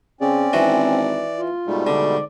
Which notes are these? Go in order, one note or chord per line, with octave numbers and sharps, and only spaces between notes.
C#3 C4 C#4 D5
G#1 E3 F#4
F4
G#2 B2 G3 A3
D3 D5